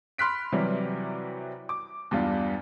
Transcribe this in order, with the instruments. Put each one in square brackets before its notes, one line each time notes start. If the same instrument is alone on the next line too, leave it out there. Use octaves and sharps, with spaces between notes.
[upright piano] B5 C6 F6 F#6 B6 D7
C3 E3 F#3 G3
D6
E2 G2 G3 D4 F4